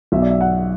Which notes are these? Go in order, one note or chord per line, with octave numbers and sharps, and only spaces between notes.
B1 B2 E5
D5
E5
F#5